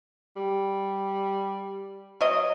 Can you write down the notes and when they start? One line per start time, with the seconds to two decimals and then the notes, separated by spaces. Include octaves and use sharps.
0.36 G3
2.21 F#3 D#5